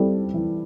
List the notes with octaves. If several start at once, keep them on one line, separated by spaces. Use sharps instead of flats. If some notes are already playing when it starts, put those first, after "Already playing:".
Already playing: G3 C4 E4 A4
E3